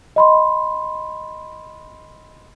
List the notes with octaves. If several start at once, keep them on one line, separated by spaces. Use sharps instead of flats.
D#5 B5 C6